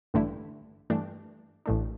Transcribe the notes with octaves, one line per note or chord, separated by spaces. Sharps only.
A1 G2 D3 A3 E4
G2 E3 A3 D4
A1 A2 A3 D4